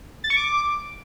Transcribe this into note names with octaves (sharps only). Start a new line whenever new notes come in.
A6
C#6
D6